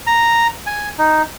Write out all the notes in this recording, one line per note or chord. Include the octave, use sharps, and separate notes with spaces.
A#5
G#5
D#4